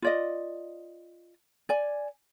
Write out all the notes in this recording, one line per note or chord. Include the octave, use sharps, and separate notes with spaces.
F4 D5 D#5
D5 G#5